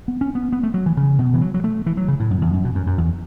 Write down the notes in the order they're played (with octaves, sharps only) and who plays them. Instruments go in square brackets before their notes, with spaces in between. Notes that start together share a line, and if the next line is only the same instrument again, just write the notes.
[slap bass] B3
C#4
B3
B3
A3
F#3
E3
C#3
B2
E3
F#3
F#3
A3
E3
F#3
C#3
A2
F#2
E2
F#2
B2
F#2
F#2
E2